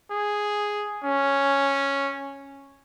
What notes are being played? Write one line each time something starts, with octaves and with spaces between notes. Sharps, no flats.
G#4
C#4